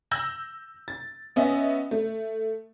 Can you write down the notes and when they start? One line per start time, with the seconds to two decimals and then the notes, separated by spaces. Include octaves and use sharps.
0.11 E6 G6 A#6 F#7
0.88 A6
1.36 B3 C#4 D#5 E5
1.91 A3